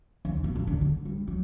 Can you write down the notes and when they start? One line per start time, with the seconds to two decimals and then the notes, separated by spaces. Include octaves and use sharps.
0.25 D#2
0.44 B2
0.55 C#3
0.67 D3
0.81 D3
1.05 G3
1.28 F#3